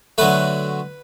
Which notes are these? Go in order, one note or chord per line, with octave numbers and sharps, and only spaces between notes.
D3 F#3 A3 B4